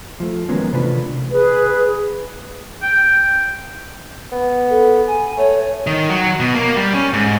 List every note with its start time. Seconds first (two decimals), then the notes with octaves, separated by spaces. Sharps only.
0.20 F3 A3
0.49 D#3 F#3 G#3 A#3 B3 C#4
0.73 C3 E3 A3 D4 F4 B4
1.31 G#4 B4
2.82 G5
4.32 B3
4.70 A4
5.07 G#5
5.37 A3 C#5
5.87 D#3
6.09 F#3
6.40 B2
6.54 A#3
6.76 G3
6.94 C#4
7.13 G#2